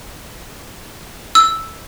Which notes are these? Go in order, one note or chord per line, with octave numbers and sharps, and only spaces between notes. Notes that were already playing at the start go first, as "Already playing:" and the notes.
E6